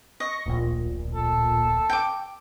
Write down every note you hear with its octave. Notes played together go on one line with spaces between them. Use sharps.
D#5 C#6 A#6
D1 A#1 A#2
A4
G5 D6